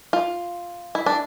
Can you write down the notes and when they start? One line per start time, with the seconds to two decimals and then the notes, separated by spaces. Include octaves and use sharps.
0.13 F4
0.95 E4
1.06 D4